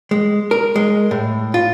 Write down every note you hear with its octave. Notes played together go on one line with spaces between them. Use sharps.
G#3
A#4
G#3
A2
F4